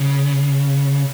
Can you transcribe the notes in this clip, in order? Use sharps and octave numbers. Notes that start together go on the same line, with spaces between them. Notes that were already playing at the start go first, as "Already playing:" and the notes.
Already playing: C#3